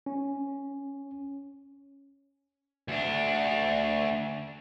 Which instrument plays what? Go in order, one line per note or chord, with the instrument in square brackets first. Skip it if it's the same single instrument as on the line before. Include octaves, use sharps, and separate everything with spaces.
[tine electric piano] C#4
[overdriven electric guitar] D2 D4